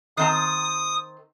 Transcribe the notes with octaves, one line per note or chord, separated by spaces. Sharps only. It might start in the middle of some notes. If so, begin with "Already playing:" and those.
D#3 C4 A#5 D#6